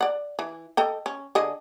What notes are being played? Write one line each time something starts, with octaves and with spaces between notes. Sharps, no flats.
D5 F#5
E3
A4 D#5 G5
C#4
D3 G#4 D#5